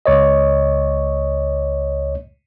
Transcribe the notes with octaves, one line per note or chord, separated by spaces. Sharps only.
C#2 C#5 D#5